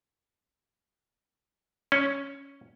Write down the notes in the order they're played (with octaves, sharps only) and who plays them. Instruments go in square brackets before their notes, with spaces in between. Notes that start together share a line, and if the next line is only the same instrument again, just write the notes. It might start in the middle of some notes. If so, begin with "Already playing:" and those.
[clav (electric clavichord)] C#4